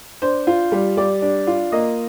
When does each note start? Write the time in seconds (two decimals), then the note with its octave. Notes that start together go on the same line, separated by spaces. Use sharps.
0.22 D4 C5
0.47 F4
0.72 G3
0.97 G3 D5
1.22 D4
1.47 F4
1.72 A#3 D#5